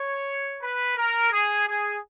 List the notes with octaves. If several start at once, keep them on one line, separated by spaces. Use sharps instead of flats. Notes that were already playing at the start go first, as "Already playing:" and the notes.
Already playing: C#5
B4
A#4
G#4
G#4